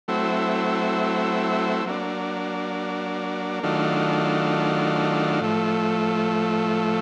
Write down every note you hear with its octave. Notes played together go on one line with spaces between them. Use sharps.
F#3 A3 C4 E4
F#3 A#3 D4
D#3 F#3 A3 D4 F4
A2 F3 A3